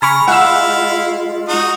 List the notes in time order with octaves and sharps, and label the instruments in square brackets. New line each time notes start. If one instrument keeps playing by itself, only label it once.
[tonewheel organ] C#3 [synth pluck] G#5 B5 C#6 [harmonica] A#5 F6
[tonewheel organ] G#3 F4 [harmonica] E4 F5 [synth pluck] F#5 E6
[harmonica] D#4 F#4 D#6